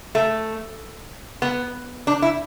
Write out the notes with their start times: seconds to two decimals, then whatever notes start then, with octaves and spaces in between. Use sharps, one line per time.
0.15 A3
1.42 B3
2.07 D4
2.22 E4